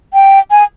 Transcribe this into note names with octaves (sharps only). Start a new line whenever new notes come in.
G5
G#5